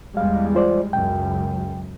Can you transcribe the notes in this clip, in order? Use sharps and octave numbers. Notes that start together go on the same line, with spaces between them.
E2 G3 G#3 F5
F4 C5 D5
C#2 F#2 G5